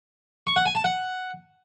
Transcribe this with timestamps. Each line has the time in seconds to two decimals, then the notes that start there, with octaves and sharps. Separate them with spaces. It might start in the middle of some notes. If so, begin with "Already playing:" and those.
0.47 C#6
0.56 F#5
0.66 G#5
0.75 A5
0.84 F#5